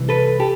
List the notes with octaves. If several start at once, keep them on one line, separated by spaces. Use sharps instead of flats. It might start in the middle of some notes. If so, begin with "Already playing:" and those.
Already playing: C2 C3 E3
A4 B4
G4 A4